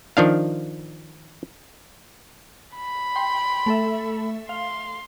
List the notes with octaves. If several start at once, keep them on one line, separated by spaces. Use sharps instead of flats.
D#3 F3 D4 F5
B5
G5 C6
A3 A4 E5
F5 C6